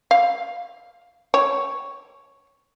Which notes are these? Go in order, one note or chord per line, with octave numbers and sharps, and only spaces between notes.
F5
C#5